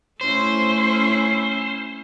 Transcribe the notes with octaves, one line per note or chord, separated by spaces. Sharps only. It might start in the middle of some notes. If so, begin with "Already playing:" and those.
A3 C#4 E4 C5